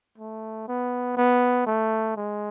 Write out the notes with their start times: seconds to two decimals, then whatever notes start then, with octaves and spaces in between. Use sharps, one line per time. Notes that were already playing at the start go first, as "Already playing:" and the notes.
0.18 A3
0.68 B3
1.17 B3
1.66 A3
2.16 G#3